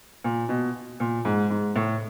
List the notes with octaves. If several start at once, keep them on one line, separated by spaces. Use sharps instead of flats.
A#2
B2
A#2
G#2
G#2
A2